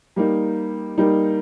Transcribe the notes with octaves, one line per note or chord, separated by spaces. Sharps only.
G3 A#3 D#4
G3 A#3 D#4